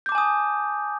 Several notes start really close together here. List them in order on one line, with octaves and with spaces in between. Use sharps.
G6 D6 A5 G#5 D#6